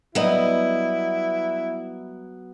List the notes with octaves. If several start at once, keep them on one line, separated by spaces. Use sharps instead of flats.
F#3 G3 B3 E4 D#5